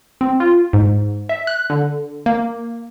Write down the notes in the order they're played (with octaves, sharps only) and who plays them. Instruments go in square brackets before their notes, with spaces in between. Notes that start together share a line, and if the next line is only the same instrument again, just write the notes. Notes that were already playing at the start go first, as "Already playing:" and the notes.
[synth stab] C4
F4
G#2
E5
F#6
D3
A#3